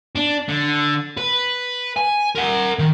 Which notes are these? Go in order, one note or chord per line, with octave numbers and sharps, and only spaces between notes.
D4
D3
B4
G#5
A#4 F#5
D#3